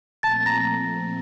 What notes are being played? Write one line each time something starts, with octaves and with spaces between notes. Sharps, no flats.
A#2 F3 A3 C4 A5 A6
A#5 A#6